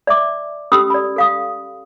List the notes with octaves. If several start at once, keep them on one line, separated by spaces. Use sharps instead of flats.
D5 E5 D6
C#4 G4 A4 B5 D#6 E6
D5 B5
A4 F5 D#6